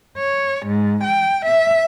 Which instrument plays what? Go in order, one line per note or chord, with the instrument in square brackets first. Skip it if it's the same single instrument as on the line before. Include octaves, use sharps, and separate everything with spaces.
[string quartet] C#5
G#2
G5
E5